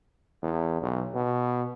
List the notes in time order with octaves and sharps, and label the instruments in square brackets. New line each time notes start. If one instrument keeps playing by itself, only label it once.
[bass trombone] E2
B1
B2